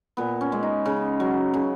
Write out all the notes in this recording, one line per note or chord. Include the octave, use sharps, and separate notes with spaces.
A#2 B3
C#4
G#3
D#4
C#3
F#3
C#3